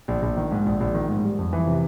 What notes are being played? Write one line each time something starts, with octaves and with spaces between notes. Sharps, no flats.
A#1
A#1
D#3
G#2
A#1
A#1
D#3
G#2
G3
F2
E3
C3